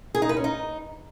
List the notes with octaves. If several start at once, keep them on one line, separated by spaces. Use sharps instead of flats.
G#4
D#4
B4
C#4
D#4